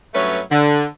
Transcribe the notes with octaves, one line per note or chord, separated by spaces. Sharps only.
G2 F#3 A3 C#4 B4 C#5
D3